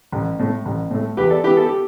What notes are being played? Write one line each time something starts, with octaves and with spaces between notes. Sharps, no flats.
A1
A2 A3
A1
A2 A3
E2 G4 B4
A4 D5
E3 B3 G4 B4
A4
G4